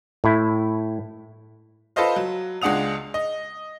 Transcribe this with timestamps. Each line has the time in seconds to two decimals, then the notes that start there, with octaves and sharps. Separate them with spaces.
0.24 A2 E4
1.96 F4 A4 B4 C5 D#5 F5
2.16 F#3
2.62 C#2 G#3 D4 F#5 D#6 F7
3.14 D#5